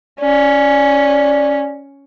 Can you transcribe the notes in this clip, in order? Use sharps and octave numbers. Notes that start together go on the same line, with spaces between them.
C#4 D5